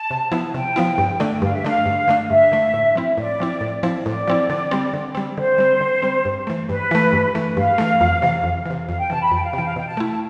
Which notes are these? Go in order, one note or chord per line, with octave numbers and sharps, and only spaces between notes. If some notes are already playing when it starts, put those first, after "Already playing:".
Already playing: A5
C3
F3 B3 E4
C3 G5
F3 B3 E4
G2
D3 A3 D4
G2 F5
E5
D3 A3 D4 F5
G2
D3 A3 D4
G2 E5
D3 A3 D4
A2
F3 C4 E4
A2 D5
F3 C4 E4
A2
F3 C4 E4
A2 D5
F3 C4 E4
D3
G3 C4
D3
G3 C4
D3 C5
G3 C4
D3
G3 C4
G2
E3 A3
G2 B4
E3 A3
G2
E3 A3
G2 F5
E3 A3
F2
C3 E3
F2
C3 E3
F2 F5
G5
C3 E3 A5
B5
F2 G5
F5
C3 E3 G5
F5
B2 G5
A5
A3 E4
A5